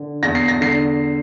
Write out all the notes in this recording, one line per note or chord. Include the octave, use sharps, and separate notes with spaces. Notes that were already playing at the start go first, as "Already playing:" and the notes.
Already playing: D3
E2 A#6
C7
A#6
D3 C7